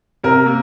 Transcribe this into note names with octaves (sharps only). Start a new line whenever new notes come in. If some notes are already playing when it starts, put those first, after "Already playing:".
C3 A#4
A#3